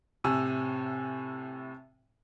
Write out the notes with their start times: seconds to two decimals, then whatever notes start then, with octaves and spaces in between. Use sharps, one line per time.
0.24 A2 C3 G#5 E6